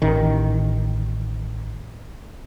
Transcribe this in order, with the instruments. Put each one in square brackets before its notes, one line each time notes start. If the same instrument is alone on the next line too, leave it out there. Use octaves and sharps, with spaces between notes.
[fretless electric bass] A1 D#3